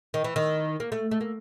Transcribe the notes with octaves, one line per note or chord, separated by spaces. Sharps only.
D#3
E3
D#3
A#3
A3
A3
A#3